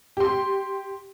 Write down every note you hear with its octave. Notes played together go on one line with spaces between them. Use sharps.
G4 C6